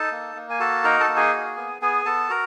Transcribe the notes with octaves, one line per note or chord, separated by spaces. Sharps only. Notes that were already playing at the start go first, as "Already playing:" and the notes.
Already playing: D#4 A4 A5
A#3
A#3
G#5
F#4 A4 A5
D#4 A#4 A#5
A4 A5
A#3
G#4 G#5
F#4
B3
B3 G#4 G#5
B3 A4 A5
F#4 A#4 A#5